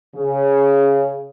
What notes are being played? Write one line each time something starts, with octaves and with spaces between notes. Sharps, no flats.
C#3